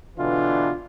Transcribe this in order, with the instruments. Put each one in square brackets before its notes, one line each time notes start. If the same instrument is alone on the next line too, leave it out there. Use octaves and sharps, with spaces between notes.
[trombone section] B2 D3 E3 D4 F4